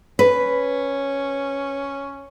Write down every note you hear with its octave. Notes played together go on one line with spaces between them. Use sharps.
C#4 B4